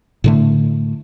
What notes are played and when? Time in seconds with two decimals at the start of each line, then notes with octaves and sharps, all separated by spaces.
0.24 A2 D3 A3